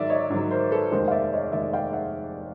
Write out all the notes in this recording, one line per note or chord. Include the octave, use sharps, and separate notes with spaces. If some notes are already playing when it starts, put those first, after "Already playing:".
Already playing: G#2 D#3 F#3 D5 E5
C#5 D#5
G#2 D#3 F#3
A#4 C5
A4 B4
F1 D#2 D#3 G#3 A#4 C5
F5
D5 E5
C#5 D#5
F1 D#2 D#3 G#3 D5 E5
F5 G5
E5 F#5